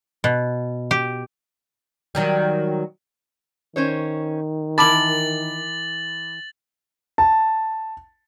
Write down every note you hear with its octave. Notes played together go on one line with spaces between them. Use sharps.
B2
G4
D#3 F#3 G3
D#3 C#4 C5 C#5
E3 A#4 A5 B5 D6 A6 F#7
A5